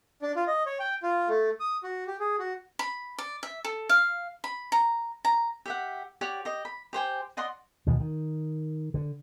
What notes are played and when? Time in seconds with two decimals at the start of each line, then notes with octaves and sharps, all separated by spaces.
0.22 D4
0.36 F4
0.47 D#5
0.66 C#5
0.80 G5
1.03 F4
1.29 A3
1.60 D#6
1.83 F#4
2.07 G4
2.20 G#4
2.39 F#4
2.79 B5
3.18 D5
3.43 E5
3.64 A4
3.89 F5
4.44 B5
4.72 A#5
5.25 A#5
5.65 G4 E5 F#5
6.21 G4 C#5 D5 F#5
6.45 G4 D#5
6.65 B5
6.93 G4 C5 G5 G#5
7.37 D5 D#5 F#5 C6
7.86 D#2 B2 E3
8.00 D#3
8.94 D3